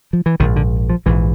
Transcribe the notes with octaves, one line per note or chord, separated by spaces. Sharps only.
F3
E3
A#1 G#2 D#3
D3
F3
A#1 G#2 E3